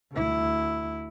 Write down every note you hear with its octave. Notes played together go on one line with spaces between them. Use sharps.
D2 E4